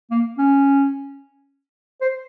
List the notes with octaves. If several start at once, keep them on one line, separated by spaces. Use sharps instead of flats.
A#3
C#4
C5